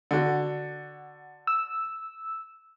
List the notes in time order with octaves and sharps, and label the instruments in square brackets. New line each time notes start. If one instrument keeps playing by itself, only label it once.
[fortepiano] D3 F#4
[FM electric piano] E6